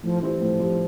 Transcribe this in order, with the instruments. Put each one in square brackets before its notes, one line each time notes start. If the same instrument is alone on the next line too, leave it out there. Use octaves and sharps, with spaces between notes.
[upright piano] A2 [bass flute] F3
[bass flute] E3 [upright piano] G3 C4
[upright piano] A2 [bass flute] F3
[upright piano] G3 C4